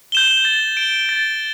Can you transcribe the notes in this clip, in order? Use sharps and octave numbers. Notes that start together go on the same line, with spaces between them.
G6 E7 G7
A6
D7 G7
A6